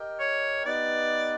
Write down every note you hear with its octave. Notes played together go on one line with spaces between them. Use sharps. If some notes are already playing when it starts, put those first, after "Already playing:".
Already playing: G4 A#4 D#5 G5
C#5
B3 D#4 G4 B4 D5 D#5